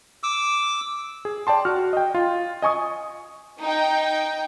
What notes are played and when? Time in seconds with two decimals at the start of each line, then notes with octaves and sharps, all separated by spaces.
0.23 D6 E6
1.25 G#4
1.47 D5 G5 A5 C6
1.65 F#4 F6
1.93 D#5 G5
2.14 F4
2.62 D#5 G#5 C#6 D#6
3.61 D#4 G5